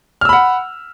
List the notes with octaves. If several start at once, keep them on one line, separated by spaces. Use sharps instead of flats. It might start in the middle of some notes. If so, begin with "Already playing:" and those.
F#5 B5 E6 F6